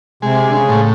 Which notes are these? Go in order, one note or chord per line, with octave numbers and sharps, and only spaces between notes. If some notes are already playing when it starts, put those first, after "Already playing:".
C3 G#3
D3
C#3
A2